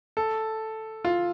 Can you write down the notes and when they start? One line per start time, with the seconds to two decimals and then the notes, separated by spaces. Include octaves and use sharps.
0.17 A4
1.05 F4